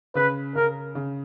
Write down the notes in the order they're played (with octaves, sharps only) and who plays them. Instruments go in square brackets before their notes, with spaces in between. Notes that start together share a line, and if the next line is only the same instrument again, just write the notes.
[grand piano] C#3 [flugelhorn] B4
[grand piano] C#3 [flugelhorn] A#4
[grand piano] C#3